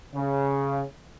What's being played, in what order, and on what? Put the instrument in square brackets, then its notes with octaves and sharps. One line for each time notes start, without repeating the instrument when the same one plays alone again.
[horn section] C#3